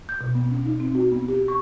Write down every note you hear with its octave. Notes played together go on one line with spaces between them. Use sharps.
G6
B2
B3
C#4
D#4
C4
F#4
B3
G4
C#6